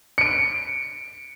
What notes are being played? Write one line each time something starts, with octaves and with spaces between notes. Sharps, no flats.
C#7 D7